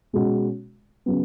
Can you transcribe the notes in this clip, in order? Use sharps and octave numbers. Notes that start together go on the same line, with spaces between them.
B2 G#3 C#4 F#4
C#3 F#3 B3